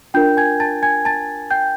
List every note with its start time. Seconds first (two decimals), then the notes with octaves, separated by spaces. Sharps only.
0.14 D4 F4 A#4 G5 G6
0.37 G#5 G#6
0.60 A5 A6
0.83 G#5 G#6
1.05 A5 A6
1.51 G5 G6